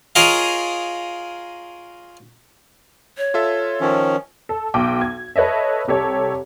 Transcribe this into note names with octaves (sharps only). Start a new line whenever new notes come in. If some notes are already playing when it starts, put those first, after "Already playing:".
F4 G#4 A#4 C#5 D#5 F5
C#5
F4 A4 E5
D#3 F3 C#4
A4
B1 G5 D6
G#6
A4 B4 C#5 D#5 E5
C2 G4 A4 C#5